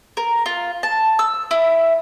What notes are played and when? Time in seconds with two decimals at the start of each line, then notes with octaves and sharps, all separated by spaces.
0.17 A#4
0.46 F4
0.83 A5
1.19 E6
1.51 E4